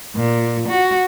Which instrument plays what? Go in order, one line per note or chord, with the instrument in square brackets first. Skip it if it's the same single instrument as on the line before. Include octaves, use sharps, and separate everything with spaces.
[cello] A#2
F#4